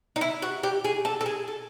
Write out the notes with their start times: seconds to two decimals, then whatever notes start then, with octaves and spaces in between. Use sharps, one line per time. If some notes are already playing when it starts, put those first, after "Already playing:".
0.16 D#4
0.21 E4
0.42 F#4
0.63 G4
0.84 G#4
1.05 A4
1.21 A4
1.26 G#4
1.48 A4